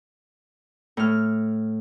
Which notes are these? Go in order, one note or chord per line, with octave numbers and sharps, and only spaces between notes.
A2 F6